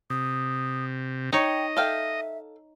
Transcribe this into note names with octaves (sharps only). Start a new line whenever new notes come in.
C3 D#6
D#4 C#5 D#5 G5
A4 E5 F5 G5